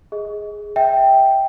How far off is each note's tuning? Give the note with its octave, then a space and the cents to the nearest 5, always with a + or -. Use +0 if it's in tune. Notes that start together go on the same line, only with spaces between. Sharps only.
G#4 +0 D#5 +20
E5 -20 G5 +0